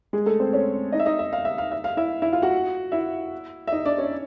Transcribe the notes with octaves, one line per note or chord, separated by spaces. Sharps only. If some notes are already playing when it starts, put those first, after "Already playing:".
G#3 G#4
A3 A4
C4 C5
C#4 C#5
D#4 D#5
E5
D#4 D#5
E5
F5
E5
F5
E5
F5
E4 E5
E4 E5
F4 F5
F#4 F#5
E4 E5
E5
D#4 D#5
D4 D5
C#4 C#5